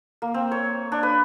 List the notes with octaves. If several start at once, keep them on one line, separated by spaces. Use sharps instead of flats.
A#3
C4
C#5
D4
B4